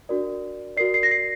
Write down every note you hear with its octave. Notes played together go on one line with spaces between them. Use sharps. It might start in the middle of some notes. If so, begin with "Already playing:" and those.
D4 F#4 A#4 D5
F#4 A#4 D5 C7
C7
A#6
C7